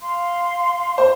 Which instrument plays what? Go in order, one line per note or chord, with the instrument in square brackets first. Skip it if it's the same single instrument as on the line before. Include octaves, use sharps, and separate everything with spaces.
[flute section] F5 C6
[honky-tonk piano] C5